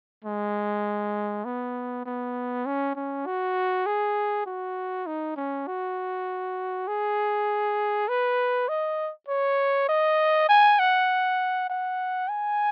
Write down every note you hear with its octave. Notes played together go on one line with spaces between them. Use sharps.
G#3
B3
B3
C#4
C#4
F#4
G#4
F#4
D#4
C#4
F#4
G#4
B4
D#5
C#5
D#5
G#5
F#5
F#5
G#5